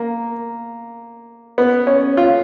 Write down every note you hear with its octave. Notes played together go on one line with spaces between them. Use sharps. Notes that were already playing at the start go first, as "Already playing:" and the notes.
Already playing: A#3
B3
C#4
F4